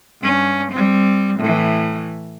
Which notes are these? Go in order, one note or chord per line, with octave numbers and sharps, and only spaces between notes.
G2 C#4
G3 C4
A2 E3